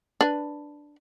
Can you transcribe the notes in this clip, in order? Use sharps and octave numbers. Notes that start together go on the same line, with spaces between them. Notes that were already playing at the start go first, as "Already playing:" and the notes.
D4 B4